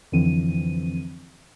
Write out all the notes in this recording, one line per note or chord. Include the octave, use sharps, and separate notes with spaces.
F2 D3 E3 F3 C4 D#7